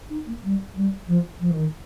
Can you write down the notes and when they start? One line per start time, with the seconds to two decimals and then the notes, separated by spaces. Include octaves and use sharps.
0.10 D#4
0.26 A#3
0.42 G3
0.75 G3
1.07 F3
1.40 F3
1.50 D#3